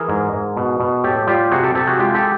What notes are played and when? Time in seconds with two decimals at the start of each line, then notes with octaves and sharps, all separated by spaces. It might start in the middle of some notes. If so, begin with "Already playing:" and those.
Already playing: E3 G#4 A#4
0.09 G#2
0.33 G#2
0.57 B2
0.80 B2
1.04 A2 G4 A4
1.27 G3 F4 G4
1.51 C3 F#4 G#4
1.63 G4 A4
1.75 C3 G4 A4
1.87 F#4 G#4
1.99 G#3 F4 G4
2.14 G4 A4